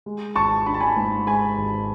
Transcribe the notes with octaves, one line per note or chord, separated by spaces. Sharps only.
G#3
G#1 A5 C#6
D4 B5
A5
G#5 B5
G#2
G#3 G#5 B5
G#1